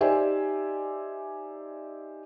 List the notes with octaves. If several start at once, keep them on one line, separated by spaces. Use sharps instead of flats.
D#4 G4 C5 D5 E5 G#5